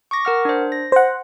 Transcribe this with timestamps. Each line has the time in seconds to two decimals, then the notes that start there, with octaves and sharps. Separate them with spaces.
0.11 C#6 D6 A#6
0.25 A#4 F#5 F6
0.45 D4 C5
0.72 A#6
0.92 C5 F#5